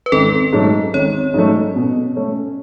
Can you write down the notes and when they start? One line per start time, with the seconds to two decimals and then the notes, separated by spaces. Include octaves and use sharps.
0.06 B4
0.12 G#1 A4
0.53 G#2 F#3 A3
0.94 G#1 C#5
1.34 G#2 F#3 A3
1.76 B2
2.16 A3 C#4